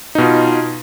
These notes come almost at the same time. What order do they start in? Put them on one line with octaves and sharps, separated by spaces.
D#4 B2 F4